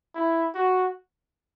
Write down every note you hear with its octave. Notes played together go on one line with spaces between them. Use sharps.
E4
F#4